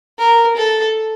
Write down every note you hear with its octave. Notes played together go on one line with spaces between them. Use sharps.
A#4
A4